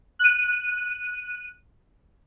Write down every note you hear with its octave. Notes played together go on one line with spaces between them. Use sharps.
F#6 D#7